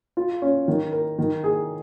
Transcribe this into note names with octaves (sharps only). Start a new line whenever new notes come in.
F4
C#4
D#3
A#4
D#3
G#4